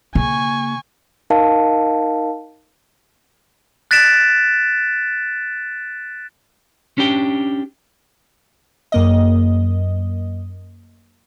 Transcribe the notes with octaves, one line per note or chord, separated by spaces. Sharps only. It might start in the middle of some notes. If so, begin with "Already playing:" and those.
C#3 A#3 G#5 C#6
D#4 A#4 D#5 F5 A5
F#6 A6 B6 D7 E7
C#4 D4 G4 G5
F#2 A#3 D#5